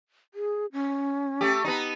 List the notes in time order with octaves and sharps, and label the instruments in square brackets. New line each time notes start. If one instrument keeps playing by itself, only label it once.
[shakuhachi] G#4
C#4
[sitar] A3 G4
B3 D#4